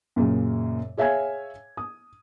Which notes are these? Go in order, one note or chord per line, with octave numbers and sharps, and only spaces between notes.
F#2 A#2 C#3 A#3
G#4 C#5 E5 F5 G#5 G#6
D#6